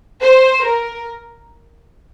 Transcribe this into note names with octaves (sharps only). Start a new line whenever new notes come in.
C5
A#4